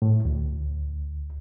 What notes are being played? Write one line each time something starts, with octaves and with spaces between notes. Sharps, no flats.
A2
D2